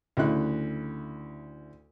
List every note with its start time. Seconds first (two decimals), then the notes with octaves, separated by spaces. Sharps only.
0.17 D2 C#3 E4 F#6